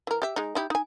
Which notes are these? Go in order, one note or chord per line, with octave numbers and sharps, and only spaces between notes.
E3 A#4
G4 E5
G#3 D#4
D#4 E4 G4
D#4 G#5